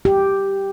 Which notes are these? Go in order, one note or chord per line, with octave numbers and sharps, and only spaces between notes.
G4